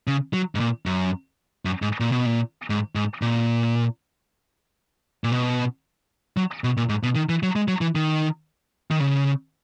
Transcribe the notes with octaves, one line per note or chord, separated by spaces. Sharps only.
C#3
F#3
G#2
A#2
F#2
F#2
G#2
A#2
B2
A#2
G#2
G#2
A#2
A#2
B2
F#3
B2
A#2
G#2
B2
D#3
E3
F#3
G#3
F#3
E3
D#3
D#3
C#3